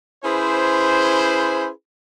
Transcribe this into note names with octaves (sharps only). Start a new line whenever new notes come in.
C#4 E4 G#4 B4 C5